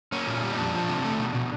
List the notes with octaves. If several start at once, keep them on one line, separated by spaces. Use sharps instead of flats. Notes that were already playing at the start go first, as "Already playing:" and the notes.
A#3 C#4
A#2
G3
D#4
F2 D4
F3
C3
A3
B2
B2